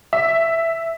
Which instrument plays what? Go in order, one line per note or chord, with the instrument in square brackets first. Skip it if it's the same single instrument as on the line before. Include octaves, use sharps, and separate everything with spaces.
[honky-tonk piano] E5